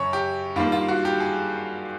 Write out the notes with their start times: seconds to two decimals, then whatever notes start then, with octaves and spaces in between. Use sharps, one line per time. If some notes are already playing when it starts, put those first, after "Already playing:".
Already playing: F#2 C#3 C#5
0.13 G4
0.56 G2 D#3 G3 A#3 F4
0.72 F4
0.89 F#4
1.05 G4
1.20 G#4